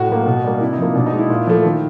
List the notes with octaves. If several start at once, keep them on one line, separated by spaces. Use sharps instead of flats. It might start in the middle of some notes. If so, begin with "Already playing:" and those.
Already playing: A2 F#4
F#3 A#3
B2
G3 A#3
C3 E4
D#4
F3 A#3
B2 D4
D#4
G#3
E4
A#2
F3 A3
D#3